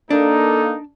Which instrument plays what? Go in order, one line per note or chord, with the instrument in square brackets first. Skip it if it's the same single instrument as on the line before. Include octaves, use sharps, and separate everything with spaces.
[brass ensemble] A#3 A4 [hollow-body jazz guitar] D4 [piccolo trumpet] D#4